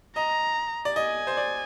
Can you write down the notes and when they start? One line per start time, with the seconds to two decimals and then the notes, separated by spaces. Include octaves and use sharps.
0.16 D#5 A#5
0.85 D5
0.96 D#5 G#5
1.27 C5
1.37 D5